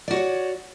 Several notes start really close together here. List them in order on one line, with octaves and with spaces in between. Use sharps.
D5 F#4 C#5 F#5